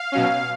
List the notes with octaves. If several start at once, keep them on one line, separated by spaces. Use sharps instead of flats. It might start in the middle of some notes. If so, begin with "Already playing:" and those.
Already playing: F5
B2 F#3 C#4